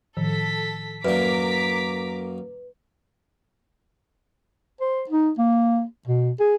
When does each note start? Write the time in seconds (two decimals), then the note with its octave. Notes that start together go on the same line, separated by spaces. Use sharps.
0.17 A2 D#3 F3 A4 B6
1.05 F#2 A#3 B4 D5 E5 A#5 D6 B6
4.81 C5
5.09 D#4
5.39 A#3
6.08 B2
6.40 G#4